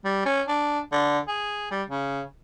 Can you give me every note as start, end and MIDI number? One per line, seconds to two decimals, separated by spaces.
0.05 0.25 55
0.25 0.42 61
0.48 0.79 62
0.92 1.19 50
1.28 1.67 68
1.71 1.83 55
1.89 2.22 49